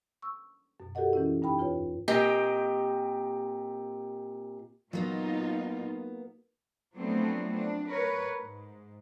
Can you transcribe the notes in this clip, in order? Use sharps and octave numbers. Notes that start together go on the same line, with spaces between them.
C#6 E6
F#2 B2
F#4 G4 A4 A#4 D#5 F#5
E3 C#4 E4
G2 D#4 G5 B5
E2 F4 B4 C#5
A#2 C4 G4 D#5 G5
A#2 F#3 A#3 B3 D#4 F4
F3 F#3 A3 B3 C4 D4
D4
A#4 B4 C#5
G#2